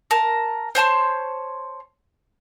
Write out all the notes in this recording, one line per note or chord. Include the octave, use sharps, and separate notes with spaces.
A#4 A5
C5 C#5 A5 C6